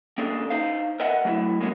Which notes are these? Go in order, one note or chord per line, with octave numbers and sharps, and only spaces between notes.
A#3 C#4 D4 G#4 A4
D#4 C5 F5
A#4 B4 D#5 E5 F#5
F#3 A3 E4
G#3 A#3 C#4 E4 F#4